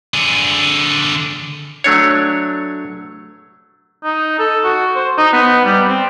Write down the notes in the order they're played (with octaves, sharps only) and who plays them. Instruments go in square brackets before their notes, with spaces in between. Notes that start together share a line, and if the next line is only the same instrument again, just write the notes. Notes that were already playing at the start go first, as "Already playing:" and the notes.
[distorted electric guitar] D3 G#4
[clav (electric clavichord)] F#3 A3 D4 C#5
[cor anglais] D#4
A4
F#4
C5
D#4
B3
G3
C4